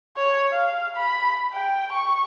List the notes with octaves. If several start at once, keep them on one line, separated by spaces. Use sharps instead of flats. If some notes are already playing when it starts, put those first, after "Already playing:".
C#5
F5
B5
G5
C#6